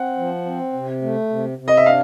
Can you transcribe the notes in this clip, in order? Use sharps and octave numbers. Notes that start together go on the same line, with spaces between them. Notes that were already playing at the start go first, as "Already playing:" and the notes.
Already playing: C4 F#5
F3
C4
C3
A3
C3
C3
D#5
E5
D4 F5